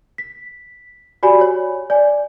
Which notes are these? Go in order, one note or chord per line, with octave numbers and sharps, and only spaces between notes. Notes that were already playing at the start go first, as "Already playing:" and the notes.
B6
F#4 G4 D5 G#5 B5
C#5
D5 G#5